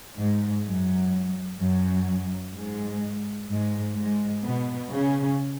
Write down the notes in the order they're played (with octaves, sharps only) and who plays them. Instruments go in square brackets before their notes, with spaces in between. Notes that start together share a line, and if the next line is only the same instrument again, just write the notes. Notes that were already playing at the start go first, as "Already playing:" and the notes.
[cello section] G#2 G#3
F#2 F#3
F#2 F#3
G#2 G#3
G#2 G#3
G#2 G#3
B2 B3
C#3 C#4